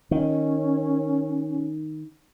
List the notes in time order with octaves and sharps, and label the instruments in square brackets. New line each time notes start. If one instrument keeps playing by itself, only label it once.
[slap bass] D#3 [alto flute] C#4